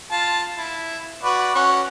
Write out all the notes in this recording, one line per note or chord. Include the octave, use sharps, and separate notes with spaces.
F4 A5
E4
F#4 B4 D5
C#4 F#4 C#6